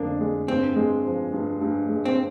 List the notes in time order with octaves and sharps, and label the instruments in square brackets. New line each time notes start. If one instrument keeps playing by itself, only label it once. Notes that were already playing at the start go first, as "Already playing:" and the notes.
Already playing: [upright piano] F2 D3 D4 [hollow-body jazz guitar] A#3
[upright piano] G#3
[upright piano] G2 [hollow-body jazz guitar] C4
[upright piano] G#3
F3
G2
G2
G#3
[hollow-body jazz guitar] C4